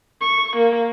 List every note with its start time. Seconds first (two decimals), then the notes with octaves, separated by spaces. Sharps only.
0.21 C#6
0.57 A#3